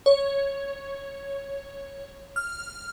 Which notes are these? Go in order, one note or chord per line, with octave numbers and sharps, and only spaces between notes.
C#5
F6